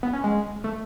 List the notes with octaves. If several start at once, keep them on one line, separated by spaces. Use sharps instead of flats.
B3
C#4
G#3
A3